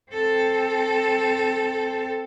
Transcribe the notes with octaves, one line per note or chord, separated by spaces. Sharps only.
C4 A4